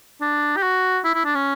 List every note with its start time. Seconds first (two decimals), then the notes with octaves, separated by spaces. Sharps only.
0.21 D4
0.57 G4
0.63 F#4
1.04 E4
1.14 E4
1.25 D4
1.35 C#4